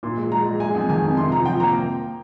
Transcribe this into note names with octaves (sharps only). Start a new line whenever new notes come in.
A#2 C6
G#3
G#3 A#5
G#3
G#3 G#5
F2
D#3 G#5
F2
C3 C6
F3 A#5
F3 G5
A#3 A#5